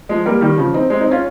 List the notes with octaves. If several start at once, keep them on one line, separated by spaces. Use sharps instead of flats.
F3 G#3
G3 A#3
D#3 G3
C#3 F3
C4 D#4
G#3 C4
C4 D#4
C#4 F4